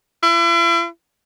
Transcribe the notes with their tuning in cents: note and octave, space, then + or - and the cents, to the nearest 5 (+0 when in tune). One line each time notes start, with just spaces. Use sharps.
E4 +40